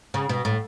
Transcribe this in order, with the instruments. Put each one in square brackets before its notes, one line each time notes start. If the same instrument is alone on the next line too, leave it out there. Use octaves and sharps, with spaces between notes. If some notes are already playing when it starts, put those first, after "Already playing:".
[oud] C#3
B2
A2